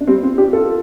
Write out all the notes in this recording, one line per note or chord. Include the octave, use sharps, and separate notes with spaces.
D4
G3 C4
C4 F4
D4 G4
F4 A4